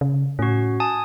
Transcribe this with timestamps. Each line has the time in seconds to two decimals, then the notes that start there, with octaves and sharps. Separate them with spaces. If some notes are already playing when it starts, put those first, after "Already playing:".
0.01 C#3
0.39 A2 C#4 F#4
0.80 G#5 A5 D#6